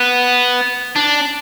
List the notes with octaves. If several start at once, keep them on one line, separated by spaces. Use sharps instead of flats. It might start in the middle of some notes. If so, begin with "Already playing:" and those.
Already playing: B3
D4